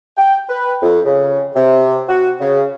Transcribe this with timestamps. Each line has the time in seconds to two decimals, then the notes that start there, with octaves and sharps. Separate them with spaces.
0.17 G5
0.49 B4
0.82 F2
1.05 C#3
1.55 C3
2.09 F#4
2.40 C#3